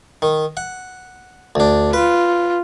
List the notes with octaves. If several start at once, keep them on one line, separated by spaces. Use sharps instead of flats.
D#3
F#5
D2 D4
F4 B4